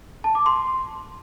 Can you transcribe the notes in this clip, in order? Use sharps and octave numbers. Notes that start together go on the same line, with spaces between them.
A5
D6
C6